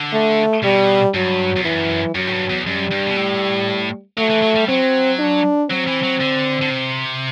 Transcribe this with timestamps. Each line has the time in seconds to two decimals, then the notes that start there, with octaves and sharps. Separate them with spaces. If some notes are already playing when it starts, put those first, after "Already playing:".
Already playing: D3
0.13 A3
0.64 B2 G3
1.14 G2 F#3
1.56 E2
1.65 F#2 E3
2.15 F#2 F#3
2.27 A2
2.33 G2
2.49 E2
2.66 F#2 G3
2.91 G2
3.06 B2
3.17 A2
4.18 F#3 A3
4.30 E3
4.43 F#3
4.56 G3
4.68 F#3 C4
5.19 D4
5.70 F#3 C4
5.87 E3
6.03 F#3
6.21 D3
6.62 D3
6.70 C3